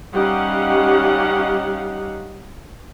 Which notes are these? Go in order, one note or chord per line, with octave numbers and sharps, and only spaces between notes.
G3 C#4 D#4 G4 F5 F#5